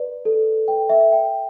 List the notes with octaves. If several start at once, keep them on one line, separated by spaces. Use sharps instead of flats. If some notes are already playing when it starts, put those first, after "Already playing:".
Already playing: B4 D5
A4
G5
E5
G5